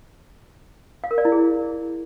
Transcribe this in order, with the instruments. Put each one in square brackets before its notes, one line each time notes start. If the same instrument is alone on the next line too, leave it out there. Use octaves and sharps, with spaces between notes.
[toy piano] F5
A#4
D5
E4
G#4